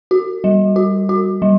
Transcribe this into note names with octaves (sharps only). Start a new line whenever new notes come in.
F#4
G3
F#4
F#4
G3